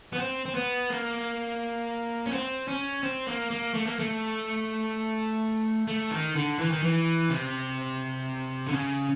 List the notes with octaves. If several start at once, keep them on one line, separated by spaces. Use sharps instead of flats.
B3
C4
C4
B3
A#3
C#4
C4
C#4
C4
A#3
A#3
A3
A#3
A3
A3
D#3
D3
E3
D#3
E3
C3
D3
C#3